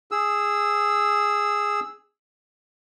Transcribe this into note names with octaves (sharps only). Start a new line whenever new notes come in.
G#4 E6